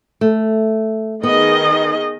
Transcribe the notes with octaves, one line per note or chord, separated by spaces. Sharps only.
A3
D#3 B3 G#4 D#5